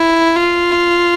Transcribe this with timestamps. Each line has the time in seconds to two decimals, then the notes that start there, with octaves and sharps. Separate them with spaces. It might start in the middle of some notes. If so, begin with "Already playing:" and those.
Already playing: E4
0.36 F4